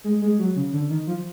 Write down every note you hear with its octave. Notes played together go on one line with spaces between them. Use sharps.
G#3
G#3
F#3
C#3
D3
D#3
F3